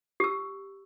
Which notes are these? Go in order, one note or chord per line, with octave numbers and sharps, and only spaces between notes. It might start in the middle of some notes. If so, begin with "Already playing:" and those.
G4 E6